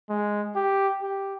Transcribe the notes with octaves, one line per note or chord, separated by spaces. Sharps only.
G#3
G4
G4